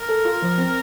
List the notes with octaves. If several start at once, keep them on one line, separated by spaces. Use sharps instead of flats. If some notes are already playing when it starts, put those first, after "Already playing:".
Already playing: A#4
A4
F4
F3
C4